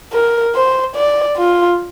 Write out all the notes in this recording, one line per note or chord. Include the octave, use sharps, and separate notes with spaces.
A#4
C5
D5
F4